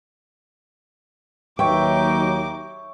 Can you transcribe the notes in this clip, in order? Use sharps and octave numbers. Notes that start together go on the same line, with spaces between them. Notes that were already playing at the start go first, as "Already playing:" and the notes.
D#2 F#3 D#4 C#5 E5 G5 D6